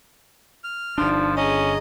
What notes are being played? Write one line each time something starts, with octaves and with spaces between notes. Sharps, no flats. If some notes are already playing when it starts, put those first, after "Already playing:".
F6
G1 F3 D4 D#4 D5
C#4 G#4 D#5 A#5